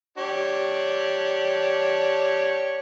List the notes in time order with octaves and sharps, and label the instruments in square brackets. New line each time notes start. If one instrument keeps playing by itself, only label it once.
[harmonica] D4 G4 C#5